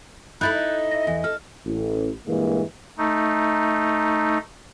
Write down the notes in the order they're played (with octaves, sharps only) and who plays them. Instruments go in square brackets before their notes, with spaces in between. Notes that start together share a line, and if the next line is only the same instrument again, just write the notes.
[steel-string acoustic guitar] D#4 E4 A4 [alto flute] B5 [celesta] F#6 G6 A6
[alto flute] D#5
[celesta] E5 A#6
[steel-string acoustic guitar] E2
[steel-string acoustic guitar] A4 [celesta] F6
[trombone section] A1
G2 A#2 E3 G#3 A#3
[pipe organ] A3 D#4